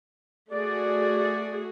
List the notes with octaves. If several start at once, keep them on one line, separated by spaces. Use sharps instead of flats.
A3 F#4 G#4 D5